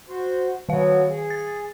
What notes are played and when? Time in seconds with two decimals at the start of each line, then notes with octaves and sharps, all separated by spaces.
0.09 F#4 C5
0.69 D#3 F#3 B3 F#4 F5
1.09 G#4
1.30 A6